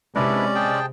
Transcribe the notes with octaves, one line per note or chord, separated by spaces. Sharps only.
C3 G#3 C#4 D4 E4 B4 D5
G#4 G5 A5